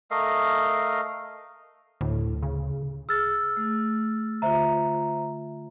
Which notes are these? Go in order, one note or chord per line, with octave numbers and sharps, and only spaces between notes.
A3 A#4 D#5 F5
D2 A2
C#3
G#4 E6 F6 A6
A3
D3 F4 C5 E5 A#5